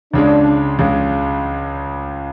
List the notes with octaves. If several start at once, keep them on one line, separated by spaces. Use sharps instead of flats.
C#2 C#3 G#3 D4
C#2 C#3 G#3